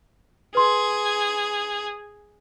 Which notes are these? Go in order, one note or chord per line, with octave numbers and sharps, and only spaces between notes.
G#4 B4 C6